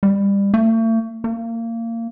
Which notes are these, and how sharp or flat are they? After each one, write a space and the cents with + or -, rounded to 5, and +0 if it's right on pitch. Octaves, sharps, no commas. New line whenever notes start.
G3 +25
A3 +40
A#3 -25